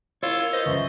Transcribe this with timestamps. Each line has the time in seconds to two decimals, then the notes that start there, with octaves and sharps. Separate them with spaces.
0.23 E4 F4 A#4 C#5 E6
0.53 B4 C5 D#5
0.66 C#2 F#2 E3 E5 C#6